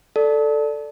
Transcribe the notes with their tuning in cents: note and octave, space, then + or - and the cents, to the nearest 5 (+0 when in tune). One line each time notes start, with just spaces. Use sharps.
A4 +0 D5 +0